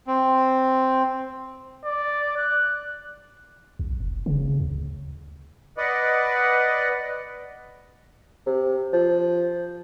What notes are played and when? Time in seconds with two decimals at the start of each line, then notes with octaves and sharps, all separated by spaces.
0.07 C4
1.85 D5
2.37 F#6
3.79 B1
4.00 F1
4.26 C#3
4.60 D2
5.77 B4 D5 D#5 F#5
8.46 C3
8.93 F3